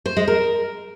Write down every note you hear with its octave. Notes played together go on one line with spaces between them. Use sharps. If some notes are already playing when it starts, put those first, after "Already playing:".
C5
G#3
A#4